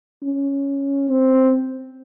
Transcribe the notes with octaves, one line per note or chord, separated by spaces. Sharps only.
C#4
C4